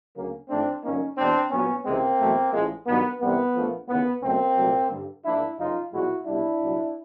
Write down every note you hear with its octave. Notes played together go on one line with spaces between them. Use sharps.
D2 C#3 F#3 A#3
A1 G#2 F3 A3 C4 D4
F#2 D3 F3 A#3 C#4 D#4
E2 B2 G#3 C4 D4
A#1 A#2 F#3 A#3 B3 C#4
C#2 C3 E3 G#3 A#3 C4
E2 B2 F#3 A3
A1 A2 F3 G#3
G2 D#3 F#3 B3
C2 C3 E3 G3 A#3 B3
A#1 A#2 F3 A3
D#2 C#3 E3 B3
C#2 B2 F#3 A3 A#3 C4
C2 A#2 F#3 A3
G2 D3 G3
G#2 F3 A#3 D4 E4
F#2 C#3 F3 D#4 F4
B1 A#2 F3 G#3 E4 F#4
C2 B2 G3 D4 E4
C2 A#2 F#3